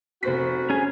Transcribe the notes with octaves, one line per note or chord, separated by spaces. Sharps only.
F1 F#4 C5 B6
C#4 G#4 G#5